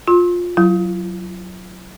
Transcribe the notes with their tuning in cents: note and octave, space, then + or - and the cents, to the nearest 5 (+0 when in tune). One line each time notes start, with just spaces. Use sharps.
F4 +15 C6 +30
F#3 +0 F4 -45